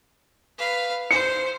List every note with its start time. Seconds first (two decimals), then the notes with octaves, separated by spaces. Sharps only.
0.58 B4 F5
1.11 C5 C#7